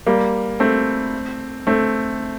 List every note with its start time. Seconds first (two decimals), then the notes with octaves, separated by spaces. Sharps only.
0.06 G3 A#3
0.60 A3 C4
1.67 A3 C4